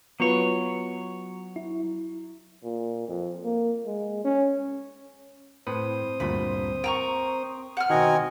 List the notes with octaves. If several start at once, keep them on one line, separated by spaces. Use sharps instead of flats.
F#3 B3 F4 B4 C#5
E4
A#2
F2
A#3
G#3
C#4
A2 C4 B4 C5 D#6
D2 G2 A#2 B5
A#4 G5 A#5 C#6
F#5 F6
B2 D#3 C4 D#4 F#4 D#5 G#5 A#5